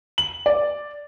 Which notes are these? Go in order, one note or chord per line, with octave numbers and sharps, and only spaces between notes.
F#7
D5